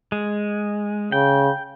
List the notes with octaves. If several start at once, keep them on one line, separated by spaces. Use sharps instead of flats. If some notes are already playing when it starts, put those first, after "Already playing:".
G#3
C#3 G5